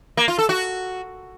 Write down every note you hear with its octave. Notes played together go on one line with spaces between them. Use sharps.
A#3
F4
A4
F#4